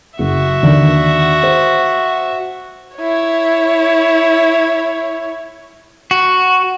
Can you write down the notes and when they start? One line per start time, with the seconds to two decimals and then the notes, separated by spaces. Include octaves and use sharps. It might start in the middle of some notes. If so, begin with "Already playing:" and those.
0.19 F#1 F#4 E5
0.63 D#2 D3
1.43 C5
2.96 E4 C#5
6.11 F#4